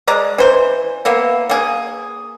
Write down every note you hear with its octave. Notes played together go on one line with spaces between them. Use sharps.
G#3 D5 A#5
E3 C5
A#3 B3 E4
A#3 G#4